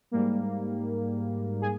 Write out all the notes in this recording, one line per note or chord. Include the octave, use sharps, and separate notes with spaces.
G#2 G3 A#3
G#4